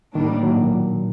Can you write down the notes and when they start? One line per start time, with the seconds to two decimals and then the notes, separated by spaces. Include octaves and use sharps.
0.15 A2 D#3 G3 A#3 D4
0.43 F#3
0.57 A#2